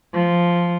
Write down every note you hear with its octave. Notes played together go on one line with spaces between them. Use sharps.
F3